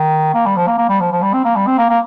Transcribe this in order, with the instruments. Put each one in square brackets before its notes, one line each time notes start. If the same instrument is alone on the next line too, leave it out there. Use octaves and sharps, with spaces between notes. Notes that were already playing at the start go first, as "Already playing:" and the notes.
Already playing: [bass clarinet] D#3
A#3
G3
F3
A#3
A#3
G3
F3
F3
G3
C4
A#3
G3
C4
A#3
A#3